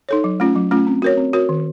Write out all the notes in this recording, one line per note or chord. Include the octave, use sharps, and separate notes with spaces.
D#4 A4 C#5
F#3
A3 C#4 F4
F#3
A3 C#4 F4
C4
F#4 A#4 C#5
C4
F#4 A#4 C#5
D#3